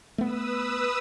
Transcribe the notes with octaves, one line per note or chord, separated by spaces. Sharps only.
A3 B3 B4 D#6 E6